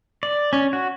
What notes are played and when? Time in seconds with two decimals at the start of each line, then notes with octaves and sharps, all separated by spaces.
0.23 D5
0.53 C#4
0.73 F#4